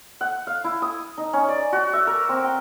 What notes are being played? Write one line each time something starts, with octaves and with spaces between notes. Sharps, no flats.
F#5
F5
E4
D#6
D#4
C#4
D5
F#4
E5
A#4
C4
G5